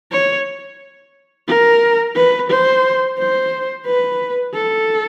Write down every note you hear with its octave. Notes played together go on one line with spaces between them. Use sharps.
C#5
A#4
B4
C5
C5
B4
A4